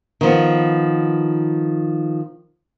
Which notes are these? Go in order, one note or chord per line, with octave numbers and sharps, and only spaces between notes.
D#3 F3 B3